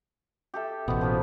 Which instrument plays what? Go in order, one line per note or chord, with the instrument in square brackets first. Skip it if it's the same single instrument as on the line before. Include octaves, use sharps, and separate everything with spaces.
[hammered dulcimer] G4 A4 E5
[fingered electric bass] A1 B2 [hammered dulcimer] B3 C5 C#5
[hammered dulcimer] F3 A#3 B5